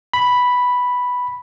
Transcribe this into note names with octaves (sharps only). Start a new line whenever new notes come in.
B5